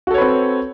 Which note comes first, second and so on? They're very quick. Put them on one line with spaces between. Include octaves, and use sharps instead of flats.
F#4 A4 C#5 B4 C4